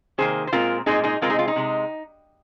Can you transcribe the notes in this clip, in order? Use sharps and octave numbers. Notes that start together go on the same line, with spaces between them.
C3 D#3 A#3 G#4 C5
C5
A#2 G#3 C4 F4 A#4
A#2 G#3 C4 D#4 G#4
D#4 G#4
C3 G#3 C4 F4 A#4
D#4 G#4
F4
D#4
C3 G#3